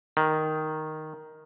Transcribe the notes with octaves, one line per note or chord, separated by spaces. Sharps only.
D#3